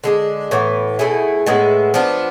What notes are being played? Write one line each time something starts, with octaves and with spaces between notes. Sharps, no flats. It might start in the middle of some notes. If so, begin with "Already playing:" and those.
D3 G#3 D4
A2 E3 B3
B2 A3 E4 G#4
A2 G#3 B3 E4
F3 B3 D4